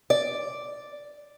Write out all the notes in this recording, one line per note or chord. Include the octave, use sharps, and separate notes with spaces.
D5